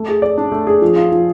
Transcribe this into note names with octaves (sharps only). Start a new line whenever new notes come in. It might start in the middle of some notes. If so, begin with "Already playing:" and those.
Already playing: A3
G#4
D5
D4
A3
G#4
F3
F4
F3